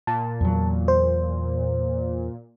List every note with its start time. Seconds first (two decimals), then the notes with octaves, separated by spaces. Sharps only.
0.07 A#2 A5
0.41 E2 F#3
0.88 C5